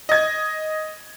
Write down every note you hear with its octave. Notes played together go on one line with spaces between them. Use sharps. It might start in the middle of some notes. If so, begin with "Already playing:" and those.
D#5 G#6